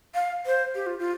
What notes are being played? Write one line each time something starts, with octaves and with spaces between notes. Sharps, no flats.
F5
C5
G4
F4
F4